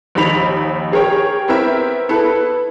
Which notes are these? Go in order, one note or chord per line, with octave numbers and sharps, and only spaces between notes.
A#1 D#2 D#4 B5 B6 F7
G4 G#4 A#4 C#5 G5
B3 C4 E4 A#4 E5
B3 E4 A4 B4